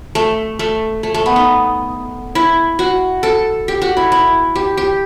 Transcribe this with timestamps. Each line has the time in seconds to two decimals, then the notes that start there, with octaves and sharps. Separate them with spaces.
0.15 A3
0.59 A3
1.03 A3
1.14 A3
1.26 B3
1.36 D#4
2.35 E4
2.79 F#4
3.23 A4
3.68 G4
3.82 F#4
3.97 E4
4.12 E4
4.55 G4
4.77 G4